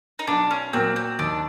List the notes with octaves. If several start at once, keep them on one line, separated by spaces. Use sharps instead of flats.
D#4
B1 D4
C#4
A#2 F#3 A#3 C4
C4
D#2 D4